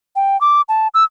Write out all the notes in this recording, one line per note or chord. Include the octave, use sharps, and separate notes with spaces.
G5
D6
A5
E6